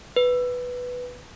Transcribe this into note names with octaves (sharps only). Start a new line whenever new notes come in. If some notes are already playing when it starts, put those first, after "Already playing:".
B4